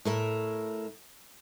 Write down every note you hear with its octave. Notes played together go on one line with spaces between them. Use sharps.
A2 A#4 E5